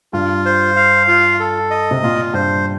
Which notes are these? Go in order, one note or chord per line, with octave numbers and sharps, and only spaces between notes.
G2 F4
C5
F5
F4
A4
D#5
C3
A#2 F4
G2 C5